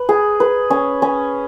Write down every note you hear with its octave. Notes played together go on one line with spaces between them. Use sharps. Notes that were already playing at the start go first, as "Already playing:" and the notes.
Already playing: B4
G#4
B4
C#4
C#4